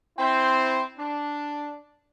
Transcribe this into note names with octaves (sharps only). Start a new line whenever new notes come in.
C4 E4 C5
D4